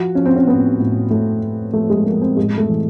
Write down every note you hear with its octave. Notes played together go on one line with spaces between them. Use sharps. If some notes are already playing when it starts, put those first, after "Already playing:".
Already playing: F3 F#4
F3 C#4
C4
C#4
A2 B3
A2
A2 A3
A2
F3 A3
G#3
F3 A#3
C4
A2 G#3
A3
E3